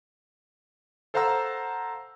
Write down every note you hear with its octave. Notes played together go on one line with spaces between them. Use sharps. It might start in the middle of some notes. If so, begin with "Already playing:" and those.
A4 C5 F5 F#5 A#5 E6